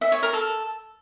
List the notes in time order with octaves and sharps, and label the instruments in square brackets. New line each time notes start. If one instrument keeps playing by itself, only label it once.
[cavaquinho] E5
C#5
A#4
A4